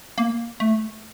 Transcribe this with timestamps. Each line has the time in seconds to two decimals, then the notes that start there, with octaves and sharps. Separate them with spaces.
0.18 A#3
0.60 A3